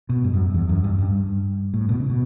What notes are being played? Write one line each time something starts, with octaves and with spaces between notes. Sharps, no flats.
B2
G2
F#2
E2
F#2
G2
G2
A2
B2
C#3
B2